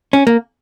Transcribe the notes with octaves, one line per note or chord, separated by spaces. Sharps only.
C#4
A#3